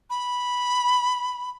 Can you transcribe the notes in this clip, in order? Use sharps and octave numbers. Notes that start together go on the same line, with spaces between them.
B5